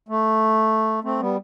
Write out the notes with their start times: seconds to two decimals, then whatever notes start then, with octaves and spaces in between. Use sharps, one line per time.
0.08 A3
1.04 A3 C4
1.19 G3 B3